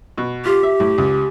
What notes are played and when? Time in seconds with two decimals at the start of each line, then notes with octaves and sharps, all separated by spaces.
0.18 B2
0.45 F4 G4
0.63 E5
0.80 A2
0.98 C#2